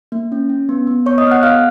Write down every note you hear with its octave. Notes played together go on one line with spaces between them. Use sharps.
A#3
C#4
C#4
B3
B3
B3 C#5 C#6
D#5 D#6
B3 F6
F#5 F#6
G#4 F5 F6